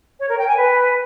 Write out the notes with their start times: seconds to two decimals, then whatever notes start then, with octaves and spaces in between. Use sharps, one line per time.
0.19 C#5
0.29 A#4
0.38 G5
0.47 G#5
0.57 B4